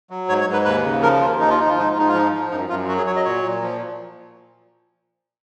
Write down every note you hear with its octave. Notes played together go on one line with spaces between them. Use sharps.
F#3
G#2 C#5
C#5
G#2
B4
D#2 B4
C#3
F3 A#4
D#2 F4
F3 D#4
F4
F3 D#4
F4
G#2 D#4
F4
G#2 D#4
F4
F3 D#4
F3
F#2 D#4
F#2 F4
F#3 F#4
G#4
F#3 C#5
D#5
A#2 C#5
A#2
F3